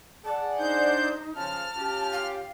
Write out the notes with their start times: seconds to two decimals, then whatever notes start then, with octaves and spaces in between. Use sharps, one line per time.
0.25 G#4 D5 F#5 A5
0.59 D4 D#4 C5 G6
1.35 C#3 F3 A5 F6
1.77 C#4 F4 G4
2.12 F5